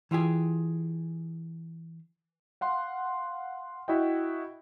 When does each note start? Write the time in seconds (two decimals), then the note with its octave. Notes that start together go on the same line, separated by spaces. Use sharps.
0.11 E3 F4 G4 G#4
2.61 F5 F#5 C6
3.88 E4 F#4 D#5 G5